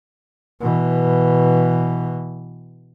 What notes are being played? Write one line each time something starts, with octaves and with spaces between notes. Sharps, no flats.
B2 E3